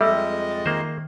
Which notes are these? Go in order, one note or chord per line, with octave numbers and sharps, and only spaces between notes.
F2 G3 G#3 A4 D#5 E5 E6
A6
D#3 A#3 C5